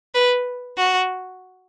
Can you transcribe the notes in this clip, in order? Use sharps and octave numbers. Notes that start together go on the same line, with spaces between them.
B4
F#4